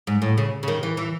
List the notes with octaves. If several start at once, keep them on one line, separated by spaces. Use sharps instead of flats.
G#2
A2
C#3
C#3
D#3
E3
E3